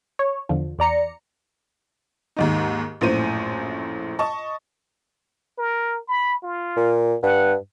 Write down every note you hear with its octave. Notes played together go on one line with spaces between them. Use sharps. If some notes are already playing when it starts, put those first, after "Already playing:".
C#5
E2 D3 F3
E2 D5 A#5 C#7
D#2 G#2 D#4
A#1 F#2 A2 C5 D#7
D#5 A5 C#6
A#4
B5
F4
A#2
G2 F#5